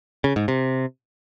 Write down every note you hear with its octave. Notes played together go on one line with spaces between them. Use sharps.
C#3
G#2
C3